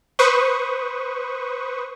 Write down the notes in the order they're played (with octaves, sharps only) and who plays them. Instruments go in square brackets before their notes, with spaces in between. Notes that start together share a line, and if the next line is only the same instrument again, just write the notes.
[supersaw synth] B4 C5 C#6 D#6